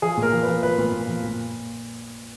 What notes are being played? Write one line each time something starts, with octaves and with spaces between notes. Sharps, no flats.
F3 G#4
A#2
A#4
F3
B4
F3
F3 B4
A#2
A#2
F3
A#2